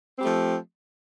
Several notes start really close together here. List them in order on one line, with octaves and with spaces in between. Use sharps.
C4 G4 A3 F3